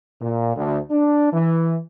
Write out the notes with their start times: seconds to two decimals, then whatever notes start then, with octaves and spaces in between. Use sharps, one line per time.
0.22 A#2
0.57 D2
0.91 D4
1.33 E3